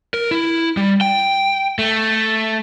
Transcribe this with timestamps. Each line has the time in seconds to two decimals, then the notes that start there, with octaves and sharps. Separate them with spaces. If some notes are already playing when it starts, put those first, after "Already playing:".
0.14 A#4
0.31 E4
0.77 G3
1.01 G5
1.79 A3